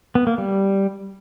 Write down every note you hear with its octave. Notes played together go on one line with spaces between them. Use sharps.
B3
A#3
G3